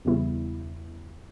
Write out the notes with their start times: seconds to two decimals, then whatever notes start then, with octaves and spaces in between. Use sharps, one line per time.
0.05 E2 C#3 G3 B3 E4